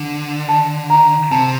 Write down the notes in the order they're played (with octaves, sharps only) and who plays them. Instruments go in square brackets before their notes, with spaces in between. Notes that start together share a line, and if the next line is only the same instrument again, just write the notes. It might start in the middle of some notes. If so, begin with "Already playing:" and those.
Already playing: [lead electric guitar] D3
[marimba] A5
A#5
[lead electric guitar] C3 [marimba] A5